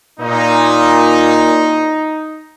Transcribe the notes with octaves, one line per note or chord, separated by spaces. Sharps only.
A#2 D#4